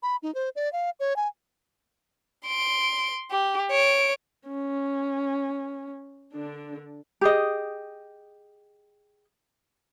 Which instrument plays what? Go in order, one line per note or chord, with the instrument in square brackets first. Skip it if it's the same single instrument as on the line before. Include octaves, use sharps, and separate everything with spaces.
[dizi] B5
D#4
C5
D5
F5
C#5
G#5
[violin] C6 D7
G4
C#5 D7
[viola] C#4
D3 D4
[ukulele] G4 G#4 D#5